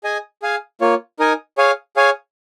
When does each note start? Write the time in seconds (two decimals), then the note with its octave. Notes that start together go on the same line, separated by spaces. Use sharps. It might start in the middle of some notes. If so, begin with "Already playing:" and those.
0.04 G#4 D#5 G#5
0.42 G#4 F5 G#5
0.81 A#3 F4 C#5
1.19 D#4 A#4 D#5 G#5
1.58 G#4 C#5 F5 G#5
1.96 G#4 C#5 F5 G#5